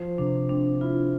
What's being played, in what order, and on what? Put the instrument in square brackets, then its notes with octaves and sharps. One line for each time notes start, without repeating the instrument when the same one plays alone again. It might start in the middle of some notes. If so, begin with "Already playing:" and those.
Already playing: [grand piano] F3 [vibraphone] C5
[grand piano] C3 [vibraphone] D4
[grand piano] C4 [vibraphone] D4
[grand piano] E4 [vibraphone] F4